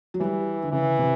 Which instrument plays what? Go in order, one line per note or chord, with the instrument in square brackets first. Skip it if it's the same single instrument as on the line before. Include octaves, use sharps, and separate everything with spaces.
[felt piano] F#3
[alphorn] E3 [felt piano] G3
[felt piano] D3
[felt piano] C#3 [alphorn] E3
[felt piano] C3